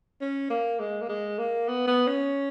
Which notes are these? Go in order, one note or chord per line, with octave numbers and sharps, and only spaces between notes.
C#4
A#3
G#3
A#3
G#3
A#3
B3
B3
C#4